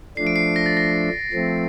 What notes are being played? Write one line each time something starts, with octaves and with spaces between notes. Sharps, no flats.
F3 A3 D4 C7
D7
C7
A#6
A6
A#6
F3 A3 C4